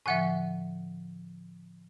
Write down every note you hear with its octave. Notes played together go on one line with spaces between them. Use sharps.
A2 D3 F3 E5 F#5 G#5